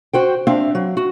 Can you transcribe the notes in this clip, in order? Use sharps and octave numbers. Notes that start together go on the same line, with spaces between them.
F#4 C5 G5
C4 D4 E5 F5
F#3
F#4